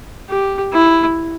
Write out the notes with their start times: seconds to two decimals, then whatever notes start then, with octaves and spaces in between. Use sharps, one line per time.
0.29 G4
0.73 E4